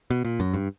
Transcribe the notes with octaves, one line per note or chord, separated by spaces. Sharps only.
B2
A#2
F#2
G2